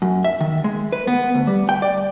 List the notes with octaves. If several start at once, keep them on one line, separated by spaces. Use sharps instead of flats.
F#2
E5
D#3
G#3
B4
B3
D2
G3
G5
D5